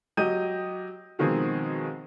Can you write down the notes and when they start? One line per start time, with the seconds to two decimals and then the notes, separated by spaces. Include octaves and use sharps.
0.17 F#3 G4 D#5 G6 D#7
1.19 B2 D#3 F3 G#3 C4 G#4